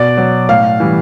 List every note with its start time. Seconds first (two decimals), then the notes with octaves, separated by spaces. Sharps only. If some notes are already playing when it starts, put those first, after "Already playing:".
Already playing: B2 D5
0.17 F#3
0.49 A2 F5
0.80 E3 G3